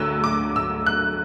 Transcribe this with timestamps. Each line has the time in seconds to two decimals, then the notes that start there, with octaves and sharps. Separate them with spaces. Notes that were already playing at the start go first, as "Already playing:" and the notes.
Already playing: D2 D3 F#3 E6 F#6
0.24 D6
0.56 E6
0.87 F#6